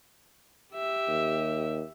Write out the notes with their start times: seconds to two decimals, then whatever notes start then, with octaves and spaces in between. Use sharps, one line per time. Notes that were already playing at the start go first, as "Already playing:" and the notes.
0.74 G4 E5
1.08 D#2